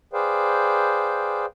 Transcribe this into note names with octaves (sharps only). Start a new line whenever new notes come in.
G#4 B4 C5 D5 F5 G5